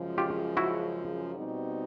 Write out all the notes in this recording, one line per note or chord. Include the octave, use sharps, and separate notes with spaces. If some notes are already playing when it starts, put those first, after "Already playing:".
Already playing: F#2 C#3 F3 G#3
F4 G4
E4 F#4
B2 G3 C4 D#4